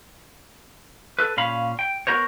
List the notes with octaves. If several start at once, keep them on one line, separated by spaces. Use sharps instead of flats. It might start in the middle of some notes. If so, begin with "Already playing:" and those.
A4 B4
A#2 C#4 F5 B5
G5
B3 F#4 A#4 C5 C#5